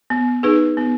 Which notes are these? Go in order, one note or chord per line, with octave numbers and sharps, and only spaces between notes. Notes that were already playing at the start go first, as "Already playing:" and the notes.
B3
D#4 G#4 B4
B3